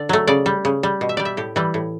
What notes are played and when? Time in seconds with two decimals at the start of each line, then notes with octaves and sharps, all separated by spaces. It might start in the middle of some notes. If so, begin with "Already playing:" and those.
Already playing: D3 D5
0.09 F#3 A3
0.27 C#3 D5
0.46 G3
0.65 C#3
0.83 G3
1.01 B2
1.09 E5
1.17 G3 D5
1.25 E5
1.37 A2 G4
1.56 E3 G3
1.74 A2